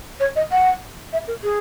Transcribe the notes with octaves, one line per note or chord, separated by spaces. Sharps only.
C#5
D#5
F#5
E5
A#4
G#4